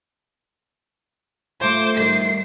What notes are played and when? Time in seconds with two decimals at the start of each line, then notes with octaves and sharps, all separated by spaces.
1.61 A3 F4 C5 D6
1.97 D#3 G3 C7